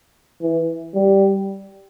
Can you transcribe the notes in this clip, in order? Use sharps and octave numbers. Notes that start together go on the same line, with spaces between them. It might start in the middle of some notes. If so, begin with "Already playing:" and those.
E3
G3